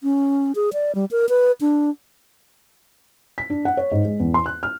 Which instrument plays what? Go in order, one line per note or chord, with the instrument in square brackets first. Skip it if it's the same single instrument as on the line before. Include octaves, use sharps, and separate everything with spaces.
[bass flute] C#4
G#4
D5
G3
A#4
B4
D4
[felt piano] B6
D4
F#5
C#5
G#2
G#3
E2
C6
F#6
F6